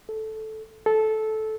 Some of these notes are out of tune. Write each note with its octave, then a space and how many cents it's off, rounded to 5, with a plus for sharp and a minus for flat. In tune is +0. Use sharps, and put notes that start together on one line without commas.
A4 -10
A4 -15